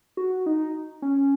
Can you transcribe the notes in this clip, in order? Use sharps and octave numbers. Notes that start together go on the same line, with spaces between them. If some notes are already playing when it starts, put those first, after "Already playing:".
F#4
D#4
C#4